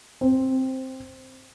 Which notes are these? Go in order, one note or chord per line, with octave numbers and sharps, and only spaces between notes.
C4